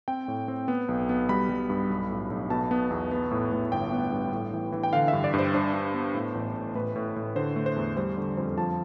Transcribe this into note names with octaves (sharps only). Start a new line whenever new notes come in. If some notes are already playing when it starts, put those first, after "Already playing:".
C4 G5
A2
C4
B3
B1
B3
G3 B5
G3
G2
B1
A2
B1
B2 A5
B3
E2
B3
A2
A2
G1 G5
B3
G2
A2
E3
E3
G5
D3 F5
E5
G2
D5
G2 C5
D4 C5
D4
B3
A2
A1
A2
A2 B4
A2
A2
D3 C5
A3
C5
E2
G3 C5
D3
F2 C5
F3 A5